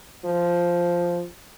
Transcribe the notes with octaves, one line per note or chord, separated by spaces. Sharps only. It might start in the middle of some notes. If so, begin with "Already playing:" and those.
F3